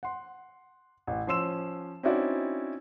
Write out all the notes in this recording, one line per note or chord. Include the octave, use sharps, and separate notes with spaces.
F#5 C6
A1
F3 C#4 C6 E6 E7
C4 C#4 D#4 E4 F#4 D5